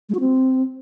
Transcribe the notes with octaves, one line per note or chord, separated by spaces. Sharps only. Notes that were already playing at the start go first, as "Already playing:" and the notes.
G#3
F#4
C4